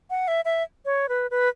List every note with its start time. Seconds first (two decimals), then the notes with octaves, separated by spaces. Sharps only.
0.10 F#5
0.28 E5
0.45 E5
0.85 C#5
1.09 B4
1.31 B4